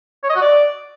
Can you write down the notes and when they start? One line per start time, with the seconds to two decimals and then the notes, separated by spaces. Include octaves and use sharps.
0.24 C#5
0.30 D#5
0.36 F#4
0.42 D5